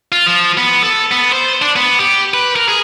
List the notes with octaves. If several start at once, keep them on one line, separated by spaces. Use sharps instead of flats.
F4
F3
B3
A4
B3
C5
D4
B3
G4
B4
A#4
G#4